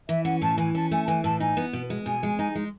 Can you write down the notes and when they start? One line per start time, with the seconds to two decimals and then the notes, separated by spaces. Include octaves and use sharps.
0.08 E3 E5
0.25 C#4 F#5
0.42 A2 A5
0.58 E3 G#5
0.75 C#4 A5
0.91 A3 G#5
1.04 A5
1.08 E3 G#5
1.24 A2 A5
1.40 D#4 G#5
1.57 B3
1.73 B2
1.90 G#3
2.06 B2 G#5
2.23 G#3
2.39 D#4
2.55 G#3